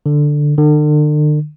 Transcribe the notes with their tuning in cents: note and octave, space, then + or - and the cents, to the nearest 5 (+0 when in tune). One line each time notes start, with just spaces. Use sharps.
D3 +5
D3 +40